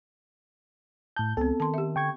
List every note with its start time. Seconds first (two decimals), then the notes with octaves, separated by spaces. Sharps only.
1.16 A2 A5 G6
1.37 C#2 B3 C4 A4
1.60 D#3 A5 C6
1.74 G4 E5
1.96 D3 G5 C#6 G#6